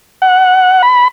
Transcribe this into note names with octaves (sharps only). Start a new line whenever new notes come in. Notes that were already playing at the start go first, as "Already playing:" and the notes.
F#5
B5